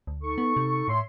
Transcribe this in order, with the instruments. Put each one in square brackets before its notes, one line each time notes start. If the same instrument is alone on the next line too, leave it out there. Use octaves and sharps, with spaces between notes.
[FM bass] D2
[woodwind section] D#4 A4 C#6
[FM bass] B3
C3
[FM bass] A2 [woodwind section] C#5 E5 C6